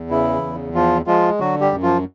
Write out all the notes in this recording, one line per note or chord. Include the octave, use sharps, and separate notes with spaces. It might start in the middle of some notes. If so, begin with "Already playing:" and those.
Already playing: E2
C#3 E3 E4
E2
F3 F4
F3 G#3 F4
D3 F#3 F#4
G3 G4
F#2
F3 F4